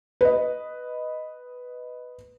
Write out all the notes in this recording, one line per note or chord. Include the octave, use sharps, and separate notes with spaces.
B4 D#5